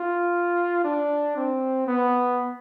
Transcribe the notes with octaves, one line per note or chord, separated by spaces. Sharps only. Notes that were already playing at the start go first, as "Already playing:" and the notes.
Already playing: F4
D4
C4
B3